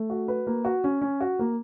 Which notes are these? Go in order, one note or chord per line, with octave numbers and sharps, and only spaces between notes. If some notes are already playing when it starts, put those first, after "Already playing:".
Already playing: A3
F#4
B4
A#3
F#4
C#4
C#4
F#4
A#3